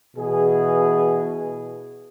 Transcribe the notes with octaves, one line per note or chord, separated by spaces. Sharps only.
B2 E3 G#4